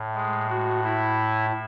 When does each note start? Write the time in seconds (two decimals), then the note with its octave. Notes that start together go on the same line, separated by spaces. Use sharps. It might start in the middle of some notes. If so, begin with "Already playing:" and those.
Already playing: A2
0.15 G#3
0.49 F#4
0.84 E4